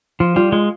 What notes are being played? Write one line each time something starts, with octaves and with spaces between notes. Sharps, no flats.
F3 F4
G3 F4
G#3 F4